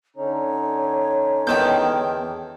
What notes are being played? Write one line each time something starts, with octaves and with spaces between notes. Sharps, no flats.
D3 C#4 D#4 C#5
E2 D#3 G5 A5 G6